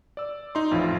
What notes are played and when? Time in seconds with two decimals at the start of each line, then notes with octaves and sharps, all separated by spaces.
0.17 D5 E6
0.55 D#4 C6
0.71 A1 F2 E4 F4